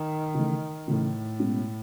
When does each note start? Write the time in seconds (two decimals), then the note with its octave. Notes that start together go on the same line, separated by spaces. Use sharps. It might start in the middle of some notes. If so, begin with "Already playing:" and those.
Already playing: D#3
0.34 C#3 E3 A3
0.87 A2 C#3 E3 A3
1.40 B2 G#3 C#4